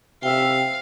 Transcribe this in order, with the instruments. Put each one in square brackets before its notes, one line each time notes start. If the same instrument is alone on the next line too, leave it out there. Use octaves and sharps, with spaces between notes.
[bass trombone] C3 [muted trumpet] E5 [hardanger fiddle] F5 [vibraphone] G5